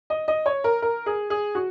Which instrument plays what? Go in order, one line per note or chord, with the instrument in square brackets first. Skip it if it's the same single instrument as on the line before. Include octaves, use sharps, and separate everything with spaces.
[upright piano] D#5
D#5
C#5
A#4
A#4
G#4
G#4
F#4